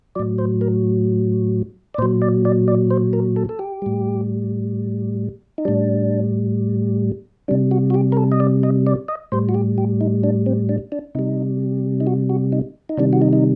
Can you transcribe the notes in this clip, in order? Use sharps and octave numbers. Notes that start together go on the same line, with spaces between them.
A2 F#3 D5
C5
A#4
D5
A#2 F#3 C5
D5
D5
D5
C5
A#4
A4
A4
G4
A2 G3
D#4
A2 G3 D4
C3 G3 D4
F#4
F#4
G4
A#4
A4
D#5
D5
D#5
D5
D#5
A2 G3 C5
F#4
G4
G4
D#4
D4
C4
D4
D4
C3 G3 D#4
D#4
F#4
F#4
D#4
D#4
C3 D#3 G3 D4
F#4
D#4
D#4